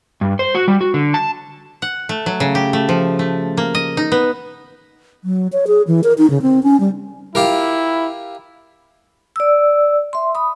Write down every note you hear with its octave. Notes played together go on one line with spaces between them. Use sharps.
G2
C5
F#4
G3
F#4
D3
A5
F#5
A3
F#3
C#3
G4
A3
F3
A3
A#3
D#5
D#4
B3
F#3
C#5
G#4
E3
A#4
D#4
C#3
C4
C#4
G3
E4 F4 G4 A#4
D5 E6
E5 C6
B5 D#6